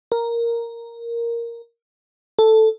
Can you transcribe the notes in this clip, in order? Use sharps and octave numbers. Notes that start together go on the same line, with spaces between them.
A#4
A4